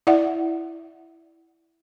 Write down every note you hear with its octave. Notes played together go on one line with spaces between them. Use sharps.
E4 D5 E5 F#5